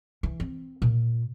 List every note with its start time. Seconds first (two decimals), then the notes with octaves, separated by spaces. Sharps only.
0.23 E3
0.40 C4
0.82 A#2